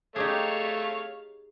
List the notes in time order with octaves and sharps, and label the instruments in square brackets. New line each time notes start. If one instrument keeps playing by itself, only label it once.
[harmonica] A3 C#5 F5 [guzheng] D#4 G4 G#4